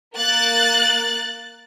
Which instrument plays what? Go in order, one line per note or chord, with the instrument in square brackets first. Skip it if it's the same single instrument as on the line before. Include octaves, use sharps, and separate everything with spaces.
[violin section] A#3 F#6 A6